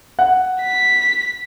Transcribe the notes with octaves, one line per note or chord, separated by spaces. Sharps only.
F#5
B6